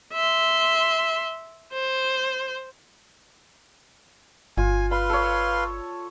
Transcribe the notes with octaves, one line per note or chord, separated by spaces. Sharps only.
E5 C6
C5
G1 F4 G#5
B4 F5 B5 C6
A4 C#5